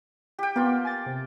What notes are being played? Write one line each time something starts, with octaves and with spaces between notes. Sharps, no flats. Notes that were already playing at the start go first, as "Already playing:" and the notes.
G4 G5
A#3 B3 F4
G#5 A6
C3